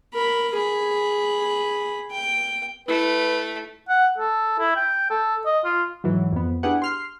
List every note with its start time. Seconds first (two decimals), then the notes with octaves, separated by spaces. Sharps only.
0.13 A#4 B5
0.54 G#4 B5
2.11 G5
2.88 A3 E4 B4
3.89 F#5
4.18 A4
4.59 E4
4.76 G5
5.10 A4
5.45 D#5
5.64 F4
6.04 G#2 E3 F#3
6.32 F2 B3
6.63 D4 E4 G4 G#4 B4 F#5
6.82 C6 F6 C7